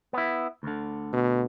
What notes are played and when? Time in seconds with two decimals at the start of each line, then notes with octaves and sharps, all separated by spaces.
0.13 B3 E4
0.63 D2 D3
1.13 B2